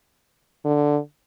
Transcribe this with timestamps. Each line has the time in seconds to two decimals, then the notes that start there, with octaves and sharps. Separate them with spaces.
0.65 D3